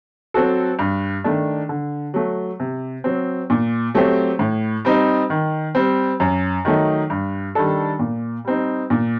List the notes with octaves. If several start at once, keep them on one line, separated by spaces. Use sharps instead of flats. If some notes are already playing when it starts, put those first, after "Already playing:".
F#3 C4 F#4 A4
G2
D#3 A3 D4
D3
F#3 A3
C3
F#3 C4
A#2
F#3 A3 C4 G4
A2
G3 C4 D#4
D#3
G3 C4
F#2
D#3 F#3 A3 D#4
G2
D#3 G3 D4 A4
A#2
G3 C4 D#4
A#2